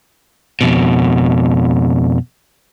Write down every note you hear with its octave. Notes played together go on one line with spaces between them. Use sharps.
F2 B2